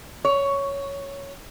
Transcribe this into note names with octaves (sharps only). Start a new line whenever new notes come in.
C#5